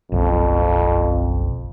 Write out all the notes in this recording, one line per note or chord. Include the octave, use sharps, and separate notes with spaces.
F#1 B1 F2